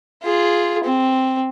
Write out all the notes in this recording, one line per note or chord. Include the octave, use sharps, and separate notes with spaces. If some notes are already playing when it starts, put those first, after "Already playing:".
F4 G#4
C4